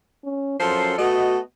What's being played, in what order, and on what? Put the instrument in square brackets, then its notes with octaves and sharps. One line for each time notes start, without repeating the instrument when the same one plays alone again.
[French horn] C#4
[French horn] F#2 [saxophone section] F3 A4 C5
[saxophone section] A3 B3 D#5 [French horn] F#4